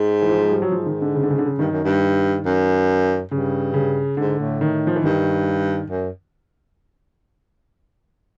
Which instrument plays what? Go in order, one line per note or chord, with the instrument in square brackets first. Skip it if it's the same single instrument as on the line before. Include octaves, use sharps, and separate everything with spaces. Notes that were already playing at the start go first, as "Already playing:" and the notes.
Already playing: [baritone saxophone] G#2
[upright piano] E3
F3
G#3
G3
F#3
[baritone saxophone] G#2 [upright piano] F3
[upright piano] D#3
D3
C#3
D3
C#3
D3
C#3
[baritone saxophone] G2 [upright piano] D#3
[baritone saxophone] F#2
G2
F#2
[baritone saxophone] G2 [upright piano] C#3
[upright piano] C#3
[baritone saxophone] G#2 [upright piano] D3
[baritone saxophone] A2
[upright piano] D#3
F3
E3
[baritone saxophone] G2 [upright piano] D#3
[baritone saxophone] F#2